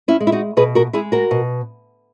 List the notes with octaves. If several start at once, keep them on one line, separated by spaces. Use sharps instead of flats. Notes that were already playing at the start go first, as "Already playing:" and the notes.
C#4 E4
G#3
E4
D#4 F#4
B2 G#4 B4
F#4 A#4
G#3 E4 G#4
F#4 A#4
B2